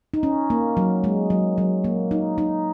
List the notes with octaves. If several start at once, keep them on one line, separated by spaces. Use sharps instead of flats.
D#4
C#4
A#3
F#3
G#3
F#3
F#3
A#3
D#4
D#4